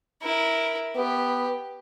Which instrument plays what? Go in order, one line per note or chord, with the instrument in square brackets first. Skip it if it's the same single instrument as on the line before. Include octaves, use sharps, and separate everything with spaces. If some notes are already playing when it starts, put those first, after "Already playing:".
[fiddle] E4 A#4
[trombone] B3 [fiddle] G4